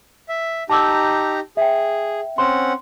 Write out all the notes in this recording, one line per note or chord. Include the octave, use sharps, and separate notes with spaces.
E5
D#4 G4 A5 A#5 D6 E6
G#4 E5 G5
C4 C#4 F#5 C6